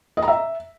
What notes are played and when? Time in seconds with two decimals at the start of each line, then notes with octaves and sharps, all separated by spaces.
0.17 D#5
0.22 A#5
0.28 E5